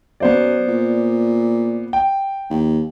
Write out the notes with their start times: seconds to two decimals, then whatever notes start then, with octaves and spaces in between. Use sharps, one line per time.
0.20 F#2 B3 C5 D5
0.68 A#2
1.93 G5
2.50 D#2